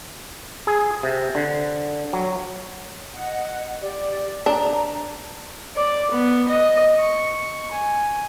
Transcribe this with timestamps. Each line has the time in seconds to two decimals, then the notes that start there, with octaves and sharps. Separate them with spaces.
0.67 G#4
1.03 C3
1.35 D3
2.13 F#3
3.12 D#5 F#5
3.81 G4 D5
4.46 D4 A#5
5.76 D5
6.11 B3
6.48 D#5
6.99 C#6
7.71 G#5